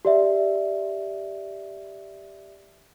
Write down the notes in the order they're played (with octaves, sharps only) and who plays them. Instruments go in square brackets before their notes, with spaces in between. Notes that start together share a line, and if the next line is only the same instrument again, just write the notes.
[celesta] G4 D5 E5